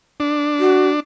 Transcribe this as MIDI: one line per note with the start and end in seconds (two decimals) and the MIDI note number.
0.20 1.00 62
0.59 0.88 66